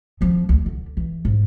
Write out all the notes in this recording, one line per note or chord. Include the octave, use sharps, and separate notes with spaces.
F3 C4
D2
D3
E3
G#2